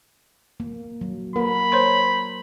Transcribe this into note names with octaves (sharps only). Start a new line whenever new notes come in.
A#3
F#3
A#3 A#4 B4 B5
C5 C#5 C6